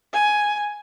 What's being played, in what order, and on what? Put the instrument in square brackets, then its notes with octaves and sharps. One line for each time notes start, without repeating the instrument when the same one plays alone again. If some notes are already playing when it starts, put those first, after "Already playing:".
[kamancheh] G#5